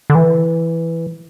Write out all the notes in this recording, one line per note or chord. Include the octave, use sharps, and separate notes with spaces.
D3
E3